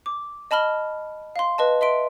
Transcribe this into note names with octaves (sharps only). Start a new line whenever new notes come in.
D6
D#5 A5 B5 F6 G7
F5 C6
B4 D#5 A5
D#5 E5 C6 D7